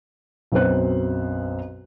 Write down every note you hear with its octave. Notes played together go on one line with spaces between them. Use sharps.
B1 F#2 C4 B4 C5 F#6